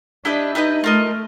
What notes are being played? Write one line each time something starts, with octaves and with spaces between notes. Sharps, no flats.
D4 E4 G4 B4 D#5
D#4 E4 G4 B4 D#5
A3 F4 A#4 D#5